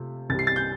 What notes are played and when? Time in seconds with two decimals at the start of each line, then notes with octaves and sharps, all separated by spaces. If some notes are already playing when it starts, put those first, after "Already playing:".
Already playing: C3 A3 F4
0.30 C2 C3 G3 A6
0.39 C7
0.47 A6
0.56 G6